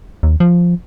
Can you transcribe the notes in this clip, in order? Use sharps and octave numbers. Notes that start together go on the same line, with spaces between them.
D#2
F3